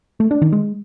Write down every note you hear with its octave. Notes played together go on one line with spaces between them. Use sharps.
A3
D4
D#3
G#3